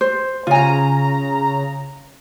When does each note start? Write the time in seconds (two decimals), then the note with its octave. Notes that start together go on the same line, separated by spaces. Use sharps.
0.01 C5
0.47 C#3 F4 G#5 A#5